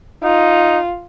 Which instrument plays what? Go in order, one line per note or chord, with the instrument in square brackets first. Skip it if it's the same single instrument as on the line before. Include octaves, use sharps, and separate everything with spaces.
[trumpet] D#4 [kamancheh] F4